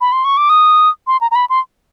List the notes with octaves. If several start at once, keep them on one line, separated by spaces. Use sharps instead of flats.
B5
C6
C#6
D6
D#6
C6
A#5
A#5
B5
C6